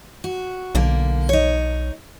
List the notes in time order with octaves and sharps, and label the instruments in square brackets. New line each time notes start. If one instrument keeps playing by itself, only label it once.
[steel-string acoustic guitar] F#4
[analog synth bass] B1 [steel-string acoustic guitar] D3 A#3
[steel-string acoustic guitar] D#4 C#5